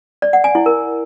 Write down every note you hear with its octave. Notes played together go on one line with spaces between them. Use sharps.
D5
F#5
G#5
E4
A#4